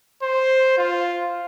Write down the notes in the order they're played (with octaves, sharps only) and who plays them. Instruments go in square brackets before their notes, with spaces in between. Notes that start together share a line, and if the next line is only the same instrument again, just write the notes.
[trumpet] C5
F4